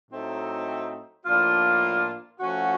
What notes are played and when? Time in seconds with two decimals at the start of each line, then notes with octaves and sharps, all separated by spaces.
0.11 A2 F#3 A3 C4 D#4
1.26 A2 F3 A#3 D4 F4
2.40 F3 A3 C#4 F#4